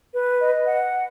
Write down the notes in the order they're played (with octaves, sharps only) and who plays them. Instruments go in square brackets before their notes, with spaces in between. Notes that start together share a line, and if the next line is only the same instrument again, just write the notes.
[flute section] B4
D#5
F#5